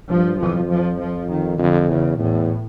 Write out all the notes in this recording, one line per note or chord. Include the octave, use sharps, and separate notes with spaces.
G2 F3
F2 F3
F3
F3
D#3
F2 D3
E2 C#3
E2 A2